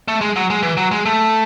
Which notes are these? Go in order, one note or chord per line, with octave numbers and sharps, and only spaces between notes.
A3
G#3
F#3
G#3
E3
F#3
G#3
A3